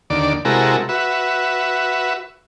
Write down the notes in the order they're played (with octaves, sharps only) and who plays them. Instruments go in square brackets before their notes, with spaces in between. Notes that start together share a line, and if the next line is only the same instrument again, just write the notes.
[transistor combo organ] D#2 D3 D5
C3 G#3 E4 F#4 A4 A#4
F#4 B4 E5